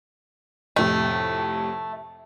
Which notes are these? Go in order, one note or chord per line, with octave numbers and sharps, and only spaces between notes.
F2 A2 C3 A3